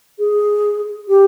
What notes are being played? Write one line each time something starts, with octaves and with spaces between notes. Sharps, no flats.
G#4
G4